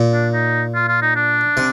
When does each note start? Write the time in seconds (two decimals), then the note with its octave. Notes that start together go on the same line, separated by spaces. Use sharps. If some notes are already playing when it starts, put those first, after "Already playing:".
Already playing: A#2
0.13 D4
0.33 D#4
0.75 F4
0.88 F4
1.02 D#4
1.16 D4
1.57 C3